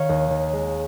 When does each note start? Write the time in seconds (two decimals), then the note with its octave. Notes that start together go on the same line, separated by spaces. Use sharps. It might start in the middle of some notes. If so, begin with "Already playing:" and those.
Already playing: D#3 C#5 F5
0.09 D#2
0.30 D#3
0.53 G#3